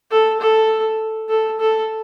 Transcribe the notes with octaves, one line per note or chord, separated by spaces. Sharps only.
A4
A4
A4
A4